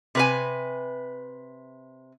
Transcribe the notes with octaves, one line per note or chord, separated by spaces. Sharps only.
C3 B4 G#5